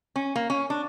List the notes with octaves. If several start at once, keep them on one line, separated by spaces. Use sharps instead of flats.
C#4
A#3
C#4
D4